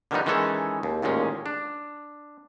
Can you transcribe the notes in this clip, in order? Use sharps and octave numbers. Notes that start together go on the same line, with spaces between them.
D3 D#3 F3 G3 B3 D#4
D#3 E3 G#3 C#4 A4
D#2
A1 D#2 A#2 G#3 C#4
D4